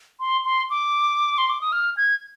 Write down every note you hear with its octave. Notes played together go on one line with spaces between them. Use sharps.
C6
C6
D6
C6
D6
D#6
F6
G#6